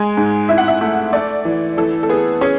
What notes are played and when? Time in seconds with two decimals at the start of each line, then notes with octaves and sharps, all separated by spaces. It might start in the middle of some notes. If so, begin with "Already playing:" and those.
Already playing: G#3 G#5
0.17 G#2
0.49 E4 E5
0.58 F#5
0.68 E5
0.81 A3
1.13 A3 D5
1.45 E3
1.77 E3 A4
2.03 A4
2.09 B3 G#4
2.41 C#4 G#4